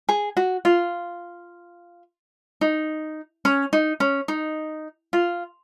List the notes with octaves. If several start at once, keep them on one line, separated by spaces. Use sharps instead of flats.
G#4
F#4
F4
D#4
C#4
D#4
C#4
D#4
F4